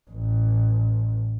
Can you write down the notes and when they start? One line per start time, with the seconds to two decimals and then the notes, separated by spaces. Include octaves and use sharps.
0.11 A1